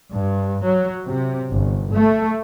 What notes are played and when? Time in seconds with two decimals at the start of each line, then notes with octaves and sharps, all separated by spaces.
0.11 G2
0.63 F#3
1.08 C3
1.50 G1
1.92 A3